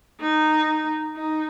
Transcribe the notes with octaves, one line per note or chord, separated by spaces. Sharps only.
D#4
D#4